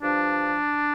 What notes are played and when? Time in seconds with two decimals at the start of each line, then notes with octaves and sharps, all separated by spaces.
0.01 G2 F3 D4